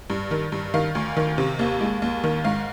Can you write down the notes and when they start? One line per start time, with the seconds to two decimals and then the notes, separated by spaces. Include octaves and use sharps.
0.10 G2
0.31 D#3
0.52 G2
0.74 D#3 F5
0.95 D2
1.17 D#3
1.38 C3
1.59 D#2
1.81 G#3
2.02 D#2
2.24 D#3
2.44 G#2 F5